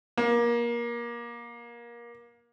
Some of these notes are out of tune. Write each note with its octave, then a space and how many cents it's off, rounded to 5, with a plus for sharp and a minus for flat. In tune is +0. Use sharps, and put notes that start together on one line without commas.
A#3 +25